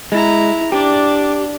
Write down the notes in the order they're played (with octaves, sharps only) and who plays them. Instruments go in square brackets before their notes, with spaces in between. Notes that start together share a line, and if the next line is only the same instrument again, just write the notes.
[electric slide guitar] G#3 [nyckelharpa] E4 A#5
[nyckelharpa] D4 D5 [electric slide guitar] G4